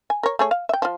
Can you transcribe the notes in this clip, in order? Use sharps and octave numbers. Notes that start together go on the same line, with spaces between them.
G#5
A#4 C#5
A3 G#4 C#5
F5
E5 G5
F3 F4